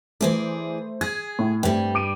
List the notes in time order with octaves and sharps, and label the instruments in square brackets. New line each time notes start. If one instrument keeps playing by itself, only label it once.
[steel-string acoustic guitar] E3 G#4 D5 [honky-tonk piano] A3 C5
[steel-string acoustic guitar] G#4 [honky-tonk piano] G#6
[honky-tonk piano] A2
[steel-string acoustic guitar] G2 G3 [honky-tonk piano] A3 C4 G4
[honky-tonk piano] D6 D7 D#7